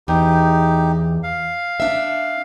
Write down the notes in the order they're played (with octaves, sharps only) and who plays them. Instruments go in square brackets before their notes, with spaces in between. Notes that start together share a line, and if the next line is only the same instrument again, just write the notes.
[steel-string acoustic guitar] E2 [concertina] D#4 G4
[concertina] F5
[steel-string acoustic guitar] D4 E5